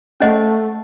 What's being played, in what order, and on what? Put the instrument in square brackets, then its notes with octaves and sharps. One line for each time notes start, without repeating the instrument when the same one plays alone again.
[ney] A3 [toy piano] C#4 G#4 C5 D#5 F#5